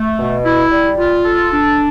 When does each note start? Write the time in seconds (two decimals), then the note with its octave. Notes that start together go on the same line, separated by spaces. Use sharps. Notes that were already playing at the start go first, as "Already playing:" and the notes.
Already playing: A3
0.19 B2
0.45 E4
0.72 G3
0.98 F4
1.25 A4
1.53 D4